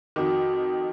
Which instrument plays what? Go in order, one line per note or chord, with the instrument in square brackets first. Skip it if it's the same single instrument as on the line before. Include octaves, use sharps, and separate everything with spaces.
[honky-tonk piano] F2 D#3 [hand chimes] F#4 D6